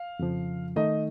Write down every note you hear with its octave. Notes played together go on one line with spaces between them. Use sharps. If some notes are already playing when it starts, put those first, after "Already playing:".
Already playing: F5
F2 C#3 F3
D#3 A3 D#4 D#5